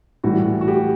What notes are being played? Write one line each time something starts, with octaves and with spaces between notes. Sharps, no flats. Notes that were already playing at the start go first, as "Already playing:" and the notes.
A2 E3 G3 F#4
F#4
G4